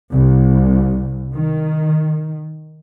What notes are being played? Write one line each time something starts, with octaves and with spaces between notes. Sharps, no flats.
C2
D#3